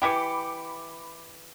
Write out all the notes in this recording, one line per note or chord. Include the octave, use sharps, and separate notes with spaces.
E3 E4 G4 B5 D6 C#7